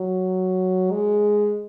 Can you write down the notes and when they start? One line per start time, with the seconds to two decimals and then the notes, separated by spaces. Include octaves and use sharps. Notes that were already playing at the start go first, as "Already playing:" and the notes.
Already playing: F#3
0.91 G#3